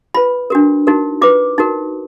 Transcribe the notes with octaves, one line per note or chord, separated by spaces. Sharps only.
F4 B4 B5
D4 F#4 A#4
D#4 F#4 A#4
F4 B4 D6
D#4 F#4 A#4